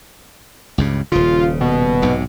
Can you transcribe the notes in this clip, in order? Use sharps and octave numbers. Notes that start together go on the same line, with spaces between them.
C#2 G2 C#3
D#1 C#3 F4
B2
B1 G#2 C3